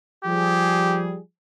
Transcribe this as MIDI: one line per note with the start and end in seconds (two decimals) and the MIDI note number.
0.25 1.17 53
0.25 1.17 55
0.25 1.03 67
0.25 1.17 68